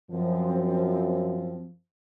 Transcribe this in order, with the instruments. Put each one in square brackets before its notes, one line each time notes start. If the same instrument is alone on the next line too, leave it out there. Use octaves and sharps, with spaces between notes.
[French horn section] F#2 F3 [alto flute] C4